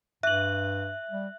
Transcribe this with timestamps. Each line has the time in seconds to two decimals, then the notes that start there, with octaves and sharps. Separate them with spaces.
0.23 G2 E5 F#6 F#7
1.11 G3